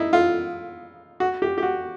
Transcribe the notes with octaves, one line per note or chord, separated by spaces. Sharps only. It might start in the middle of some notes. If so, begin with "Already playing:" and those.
Already playing: D#4 E4
F4
F#4
G4
G4
F#4